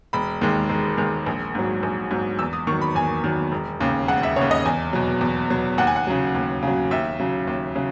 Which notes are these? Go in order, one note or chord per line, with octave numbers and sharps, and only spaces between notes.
E1 B5
D#2 D#3 G#3
E1
D#2 D#3 G#3
A#1
G#2 F#3
A#1
G#2 F#3
E2 E6
D#6
D#3 F#3 C#6
B5
E2 G#5
D#3 F#3
E1
D#2 C#3
E1 F#5
E5
D#2 C#3 C#5
D#5
E2 G#5
B2 F#3
E2
B2 F#3
D#2 F#5
G#5
F#5
C#3 F#3
D#2
C#3 F#3
D#2 E5
C#3 F#3
D#2
C#3 F#3